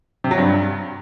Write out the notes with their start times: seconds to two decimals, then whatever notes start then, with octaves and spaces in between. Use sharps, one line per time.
0.24 C3
0.31 F#3
0.38 G2